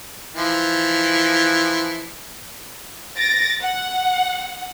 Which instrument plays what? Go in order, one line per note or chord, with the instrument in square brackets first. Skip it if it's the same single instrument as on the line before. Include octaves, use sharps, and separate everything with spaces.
[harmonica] E3 F3
[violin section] A6 A#6 D7
F#5